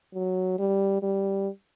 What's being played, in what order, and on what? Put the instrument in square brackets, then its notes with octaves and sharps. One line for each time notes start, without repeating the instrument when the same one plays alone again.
[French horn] F#3
G3
G3